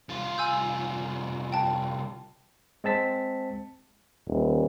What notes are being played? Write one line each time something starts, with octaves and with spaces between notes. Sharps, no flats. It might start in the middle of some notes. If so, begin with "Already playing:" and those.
C2 F4
G#5 E6 G6
G5 A5
G#3 C4 A5 B6
D#1